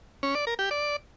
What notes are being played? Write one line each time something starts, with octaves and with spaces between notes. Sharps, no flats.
C#4
D5
A#4
G4
D5